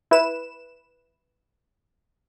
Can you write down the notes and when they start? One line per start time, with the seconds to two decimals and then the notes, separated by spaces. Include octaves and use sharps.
0.11 E4 B4 E7